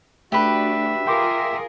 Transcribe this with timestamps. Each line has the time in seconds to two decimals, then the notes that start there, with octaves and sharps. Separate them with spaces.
0.32 A3 D4 F#4 G4 B4 E5
1.07 F4 G#4 A#4 G5 C6 D6